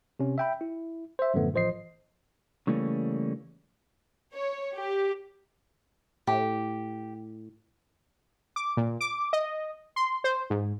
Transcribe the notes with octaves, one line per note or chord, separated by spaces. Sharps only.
C3 C#4
E5 G5 B5
E4
C5 E5
F#2 A2 D3 F3 A3 B3
A1 F3 C5 D#5 C7
C#3 E3 G3 A3 A#3 C#4
C#5
G4
A2 G4
D6
A#2
D6
D#5
C6
C5
G#2